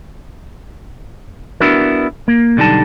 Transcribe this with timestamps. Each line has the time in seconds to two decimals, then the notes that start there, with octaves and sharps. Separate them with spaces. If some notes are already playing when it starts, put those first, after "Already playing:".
1.60 B3 D4 E4 F#4 A#4
2.28 A#3
2.57 B1 D3 G3 D#4 A5